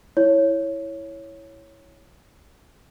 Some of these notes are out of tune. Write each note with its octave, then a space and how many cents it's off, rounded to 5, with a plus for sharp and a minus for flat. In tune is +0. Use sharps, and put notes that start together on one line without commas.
E4 +0 C#5 +0